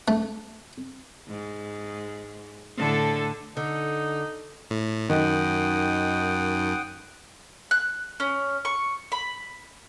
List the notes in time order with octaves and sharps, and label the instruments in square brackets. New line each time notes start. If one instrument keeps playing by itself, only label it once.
[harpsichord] A3
[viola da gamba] G#2
A2 D3 A4
[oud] D3 [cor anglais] D#4
[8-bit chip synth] A2
[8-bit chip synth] F#2 [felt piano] D#3 [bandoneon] F#5 G5 D#6
[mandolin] F#6
C#4
C#6
B5